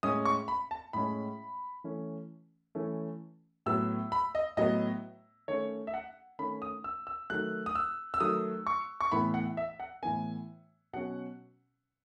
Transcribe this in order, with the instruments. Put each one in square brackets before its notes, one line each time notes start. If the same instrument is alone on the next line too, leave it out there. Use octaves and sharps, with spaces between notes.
[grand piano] A2 G#3 C#4 D#6
C#6
B5
A5
A2 G#3 C#4 B5
E3 A3 C#4
E3 A3 C#4
A2 F#3 B3 E6
B5
D#5
A2 F#3 B3 D#5
D#3 A3 C#4 C#5
E5
F#5
D#3 A3 C#4 B5
D#6
E6
E6
D#3 F#3 A3 F#6
D#6
E6
E6
D#3 F#3 A3 D#6
C#6
C#6
A2 E3 B3 B5
F#5
E5
F#5
A2 E3 B3 G#5
B2 F#3 C#4 F#5